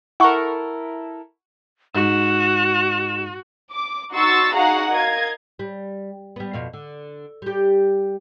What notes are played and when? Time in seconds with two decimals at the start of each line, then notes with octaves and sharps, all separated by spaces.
0.20 E4 A4 A#4 F#5 C#6
1.95 G#2 F#4 E7
3.71 D6
4.12 D#4 F#4 C6 C#6 E6 A6
4.55 D#4 F#4 G#4 F5 F#5 A#5
4.90 A#4 D#5 F5 G#6
5.59 G3
6.36 G3 B3
6.53 F2 B2 F5
6.73 D3
7.42 G3 G4